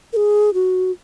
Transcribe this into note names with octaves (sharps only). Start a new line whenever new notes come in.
A#4
G#4
F#4